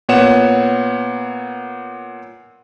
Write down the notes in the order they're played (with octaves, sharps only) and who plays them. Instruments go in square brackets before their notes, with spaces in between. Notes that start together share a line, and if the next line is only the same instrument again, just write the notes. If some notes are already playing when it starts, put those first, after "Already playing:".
[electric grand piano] A#2 B3 C#5 F#5 E7